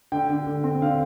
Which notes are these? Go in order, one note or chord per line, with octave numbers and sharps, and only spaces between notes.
D3 G5
D3
D3
C4
D3 F5